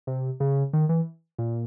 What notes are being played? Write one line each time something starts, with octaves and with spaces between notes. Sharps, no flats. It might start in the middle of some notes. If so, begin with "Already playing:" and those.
C3
C#3
D#3
E3
A#2